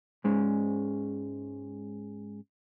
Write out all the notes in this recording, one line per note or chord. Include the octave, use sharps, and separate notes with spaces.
G#2 G#3 C#4